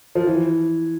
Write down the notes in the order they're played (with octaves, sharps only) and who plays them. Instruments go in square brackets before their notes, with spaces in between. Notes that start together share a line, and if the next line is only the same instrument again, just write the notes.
[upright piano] F3
E3